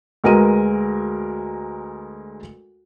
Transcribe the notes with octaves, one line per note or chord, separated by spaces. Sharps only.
D2 G#3 A#4 B4 D#7